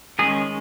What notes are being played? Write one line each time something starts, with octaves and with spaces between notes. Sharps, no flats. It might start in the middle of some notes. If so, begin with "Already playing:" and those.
D#3 G#3 C#4 G#4